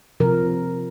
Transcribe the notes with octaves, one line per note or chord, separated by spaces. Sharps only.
C3 F3 A#4